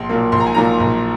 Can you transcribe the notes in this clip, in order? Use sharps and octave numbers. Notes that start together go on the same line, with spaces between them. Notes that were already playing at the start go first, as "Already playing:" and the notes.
Already playing: A#1 C6
A#2 F#3 A#3
A#1 C6
A#5
G#5
A#2 F#3 A#3 A#5
A#1